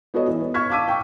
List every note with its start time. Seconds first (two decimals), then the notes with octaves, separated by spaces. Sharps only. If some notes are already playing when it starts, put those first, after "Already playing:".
0.14 B3 F#4 A4 C#5 D#5
0.28 E3
0.41 B3
0.54 C#6 F6 G#6 B6
0.70 F5 A5 D6 E6 B6 D#7
0.88 G5 C#6